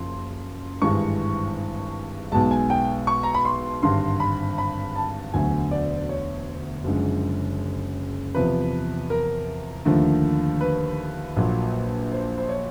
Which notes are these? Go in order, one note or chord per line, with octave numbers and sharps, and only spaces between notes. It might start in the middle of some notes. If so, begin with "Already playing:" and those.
Already playing: F#1 F#2 C#3 F3 A#3 C6
G#1 G2 E3 G#3 C#6
B1 B2 G#3 A5
G#5
G5
C#6
A#5
B5
C6
G#1 G2 D3 C6
B5
B5
A5
E1 D2 D3 F#3 A3 G#5
D5
C#5
F#1 F#2 D3 F3 G#3
E2 C3 F3 B4
A#4
D#2 D3 F3 A3
B4
A#1 A#2 F#3
C5
C5
C#5